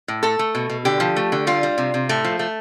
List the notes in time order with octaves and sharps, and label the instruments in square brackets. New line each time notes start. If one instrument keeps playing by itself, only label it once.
[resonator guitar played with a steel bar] A2
A3 A4
A3
B2
B2
D3 G4
F3
A3
D3
G3 F4
G3
C3
C3
A2 A3
F3
A3